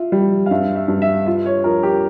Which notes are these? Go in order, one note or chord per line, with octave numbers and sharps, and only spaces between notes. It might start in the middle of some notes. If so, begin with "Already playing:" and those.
Already playing: F4 E5
G3
F5
G2 E5
E5
G2
E5
F4 E5
C#5
F3 A#4
G4